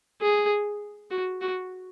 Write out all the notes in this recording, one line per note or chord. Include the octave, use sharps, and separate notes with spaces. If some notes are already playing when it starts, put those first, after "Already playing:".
G#4
F#4
F#4